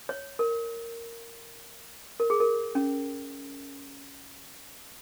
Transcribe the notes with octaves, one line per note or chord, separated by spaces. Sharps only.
C#5
A#4
A#4
G#4
A#4
C#4